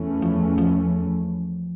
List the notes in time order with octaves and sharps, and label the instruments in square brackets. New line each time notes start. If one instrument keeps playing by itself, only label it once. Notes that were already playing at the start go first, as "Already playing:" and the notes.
Already playing: [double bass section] E2 E3 A3 C#4
[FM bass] F3
F3